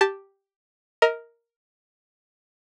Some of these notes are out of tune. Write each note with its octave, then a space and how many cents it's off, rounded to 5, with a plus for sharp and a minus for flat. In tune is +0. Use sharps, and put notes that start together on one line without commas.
G4 +0 A5 +0
A#4 +0 D#5 +35